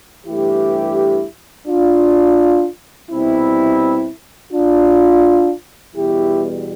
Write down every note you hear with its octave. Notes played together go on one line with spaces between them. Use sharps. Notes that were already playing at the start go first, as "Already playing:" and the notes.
G2 E3 A3 E4 G4
D4 F4
B2 G3 C4 E4
D4 F4
E2 B2 G3 E4 G4